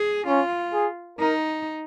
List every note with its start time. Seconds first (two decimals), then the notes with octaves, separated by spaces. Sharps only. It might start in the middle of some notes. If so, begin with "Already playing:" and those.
Already playing: G#4
0.27 C#4 F4
0.73 G#4
1.19 D#4 A#4